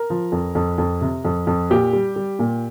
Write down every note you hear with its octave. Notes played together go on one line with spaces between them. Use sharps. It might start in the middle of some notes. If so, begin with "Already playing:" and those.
Already playing: A#4
F3
F2
F2
F2
C3
F2
F2
A#2 G4
G3
G3
A#2